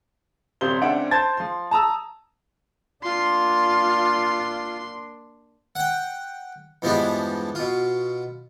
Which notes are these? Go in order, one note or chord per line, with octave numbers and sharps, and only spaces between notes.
D#1 C3 G3 C5 G7
C#2 C4 D4 E5 F#5 D7
C5 A5 G#6 A6
F3 C6
A5 A#5 D#6 E6
A#3 D4 F4 C6
F#5 G5
E2 G2 F3 G#3 B3 D4
B2 F4